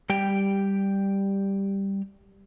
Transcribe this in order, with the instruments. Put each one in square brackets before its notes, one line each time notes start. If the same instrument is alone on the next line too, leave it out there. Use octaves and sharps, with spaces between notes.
[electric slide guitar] G3 G4 G5